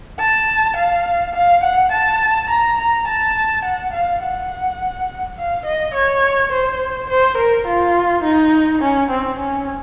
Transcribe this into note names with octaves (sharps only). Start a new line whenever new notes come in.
A5
F5
F5
F#5
A5
A#5
A#5
A5
F#5
F5
F#5
F5
D#5
C#5
C5
C5
A#4
F4
D#4
C#4
C4
C#4